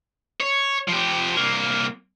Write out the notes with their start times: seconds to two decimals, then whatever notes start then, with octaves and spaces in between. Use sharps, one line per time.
0.41 C#5
0.88 F3 G4
1.37 C2 A#3